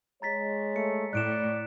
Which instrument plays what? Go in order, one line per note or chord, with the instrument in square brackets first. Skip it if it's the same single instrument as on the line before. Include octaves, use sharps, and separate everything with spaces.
[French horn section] G#3 C#5 [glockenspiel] A#5 A6 B6
[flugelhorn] A3 [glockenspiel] C#7
[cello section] A2 [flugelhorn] D5 [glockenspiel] F#6 D7 E7